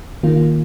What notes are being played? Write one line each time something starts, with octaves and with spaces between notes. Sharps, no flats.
D#3 A#3 F4